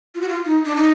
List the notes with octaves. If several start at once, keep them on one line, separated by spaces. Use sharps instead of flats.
F4
F#4
F4
D#4
D4
D#4